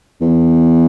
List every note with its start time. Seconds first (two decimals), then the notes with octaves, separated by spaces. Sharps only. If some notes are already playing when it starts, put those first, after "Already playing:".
0.21 E2